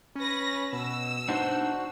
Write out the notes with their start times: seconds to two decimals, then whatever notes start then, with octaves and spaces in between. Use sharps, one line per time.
0.15 C#4 B4 A#6
0.73 B2 E6
1.28 D4 D#4 F#4 C5